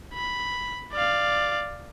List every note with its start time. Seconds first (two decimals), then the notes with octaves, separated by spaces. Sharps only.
0.14 B5
0.93 D5 F5